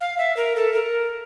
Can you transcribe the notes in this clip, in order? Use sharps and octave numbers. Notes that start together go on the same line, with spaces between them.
F5
E5
A#4
A4
A#4